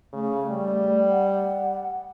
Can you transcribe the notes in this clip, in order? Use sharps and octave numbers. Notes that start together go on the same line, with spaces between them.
C#3 A3
G3
F#5